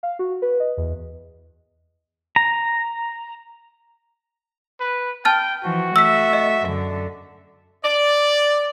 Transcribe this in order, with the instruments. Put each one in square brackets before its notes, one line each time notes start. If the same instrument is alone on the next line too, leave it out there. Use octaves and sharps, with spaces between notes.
[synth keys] F5
F#4
B4
D#5
E2
[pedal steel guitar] A#5
[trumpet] B4
[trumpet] G5 [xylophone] A5 F6 A6
[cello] E3 F3 [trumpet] F#4
[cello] A3 E5 [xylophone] E6 B6
[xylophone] D#5
[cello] F#2 D3
[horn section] D5